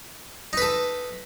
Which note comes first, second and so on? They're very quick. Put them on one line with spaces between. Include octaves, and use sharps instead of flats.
D#4 B4 A4